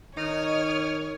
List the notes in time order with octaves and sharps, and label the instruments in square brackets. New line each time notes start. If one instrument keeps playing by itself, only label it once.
[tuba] D#3 [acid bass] D#4 [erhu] C#5 [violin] D#6 F6